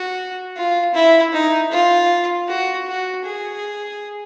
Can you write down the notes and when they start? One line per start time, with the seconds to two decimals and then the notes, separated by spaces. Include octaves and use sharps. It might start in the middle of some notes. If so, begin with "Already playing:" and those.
Already playing: F#4
0.57 F4
0.94 E4
1.33 D#4
1.71 F4
2.48 F#4
2.87 F#4
3.25 G#4